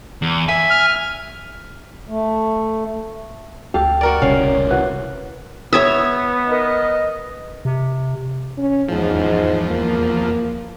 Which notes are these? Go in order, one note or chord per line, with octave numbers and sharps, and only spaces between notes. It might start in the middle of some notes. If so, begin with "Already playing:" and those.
E2
E5 G#5
F6
A3
D2 G4 A4 F5
F#4 A#4 D5
D#1 C2 C#3 C#4 F5
E3 F#4
B3 C#5 E5 D#6 G#6
A#4 B4 D#5
C3
C#4
E2 G#2 F3
A#3